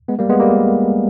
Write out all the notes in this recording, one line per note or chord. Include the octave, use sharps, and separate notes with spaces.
G#3 B3
G3 A#3
G#3 B3
G3 A#3